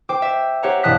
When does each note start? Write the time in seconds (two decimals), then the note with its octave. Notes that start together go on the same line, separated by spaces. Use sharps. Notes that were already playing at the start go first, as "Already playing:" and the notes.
0.09 C5 G5 D6
0.22 E5
0.63 G4 C5 C#5 F#5 A#5
0.83 E1 G2 A5 D#6 F#6 B6